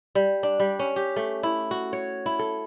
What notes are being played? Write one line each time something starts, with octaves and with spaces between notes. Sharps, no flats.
G3
D4
G3
C#4
G4
A3
E4
F#4
C#5
E4
A4